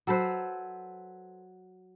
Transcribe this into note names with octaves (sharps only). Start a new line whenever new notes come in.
F#3 A4 B4 C5